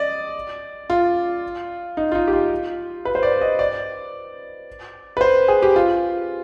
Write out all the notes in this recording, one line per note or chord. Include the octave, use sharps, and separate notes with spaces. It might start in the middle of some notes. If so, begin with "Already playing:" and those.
Already playing: D5 D#5
F4
D#4
F4
D#4
G4
F4
B4
C5
D5
D#5
D5
B4
C5
G#4
G4
F4